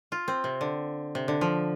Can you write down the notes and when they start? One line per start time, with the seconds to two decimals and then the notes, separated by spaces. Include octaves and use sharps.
0.12 F4
0.28 C4
0.44 C3
0.61 D3
1.15 C3
1.28 D3
1.41 F3